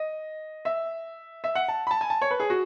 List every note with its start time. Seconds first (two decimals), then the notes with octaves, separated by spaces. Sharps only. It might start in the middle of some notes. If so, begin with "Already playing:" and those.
Already playing: D#5
0.65 E5
1.44 E5
1.55 F#5
1.68 A5
1.87 B5
1.91 A5
2.01 G#5
2.10 A5
2.22 C#5
2.31 B4
2.40 G#4
2.50 F#4